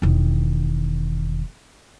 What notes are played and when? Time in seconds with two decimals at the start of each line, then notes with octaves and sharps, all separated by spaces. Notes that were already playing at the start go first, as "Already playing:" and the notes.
0.02 E1 D#3